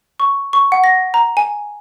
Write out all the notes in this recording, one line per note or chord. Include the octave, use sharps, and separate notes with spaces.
C#6
C#6
F#5
A#6
A#5
G#5